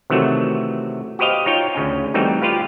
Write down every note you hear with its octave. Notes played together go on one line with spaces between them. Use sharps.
C3 D#3 E3 F#3 A3 F#4
F#4 G4 B4 C5 D#5 F5
D#4 F4 C#5 G5
D2 C#3 C#4
E3 G3 A3 C4 D#4 F#4
F4 G4 B4 F5